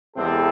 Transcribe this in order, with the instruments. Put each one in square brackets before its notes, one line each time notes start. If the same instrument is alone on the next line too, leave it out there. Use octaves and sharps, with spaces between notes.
[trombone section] E2 C3 E3 G#3 C4 A4